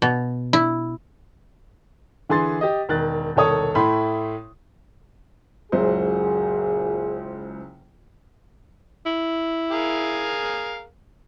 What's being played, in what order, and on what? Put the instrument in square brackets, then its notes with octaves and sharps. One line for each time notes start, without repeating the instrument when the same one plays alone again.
[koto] B2
E4
[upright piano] D3 E3 G#4 C6 A6
G4 D#5
E1 D#3 F#6 A6
E1 C2 D#3 A4 C#5 D#6
A2 A3 E4 B5 C6
[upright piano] F#1 C#2 C5 [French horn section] A#2 F#4 G#4
[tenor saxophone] E4
[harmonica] G#4 A#4 F5